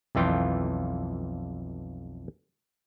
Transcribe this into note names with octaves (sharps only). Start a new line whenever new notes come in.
B1 F2 E3 F4 G5